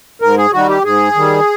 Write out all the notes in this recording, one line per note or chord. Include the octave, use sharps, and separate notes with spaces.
G#2 A#4
G#4
D#3 G3 F#4
G4
G#2 G#4
D#3 G3